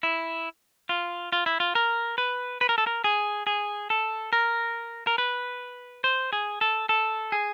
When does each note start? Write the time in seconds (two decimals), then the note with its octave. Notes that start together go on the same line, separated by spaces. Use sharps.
0.03 E4
0.89 F4
1.32 F4
1.46 E4
1.60 F4
1.75 A#4
2.18 B4
2.61 B4
2.69 A#4
2.78 A4
2.87 A#4
3.04 G#4
3.47 G#4
3.90 A4
4.33 A#4
5.07 A#4
5.18 B4
6.04 C5
6.33 G#4
6.61 A4
6.89 A4
7.32 G#4